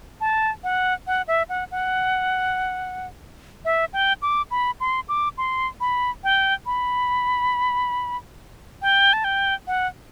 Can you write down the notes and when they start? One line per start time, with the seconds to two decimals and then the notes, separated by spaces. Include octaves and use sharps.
0.21 A5
0.64 F#5
1.07 F#5
1.28 E5
1.49 F#5
1.71 F#5
3.65 E5
3.93 G5
4.22 D6
4.51 B5
4.80 C6
5.09 D6
5.38 C6
5.81 B5
6.24 G5
6.66 B5
8.82 G5
9.13 A5
9.24 G5
9.67 F#5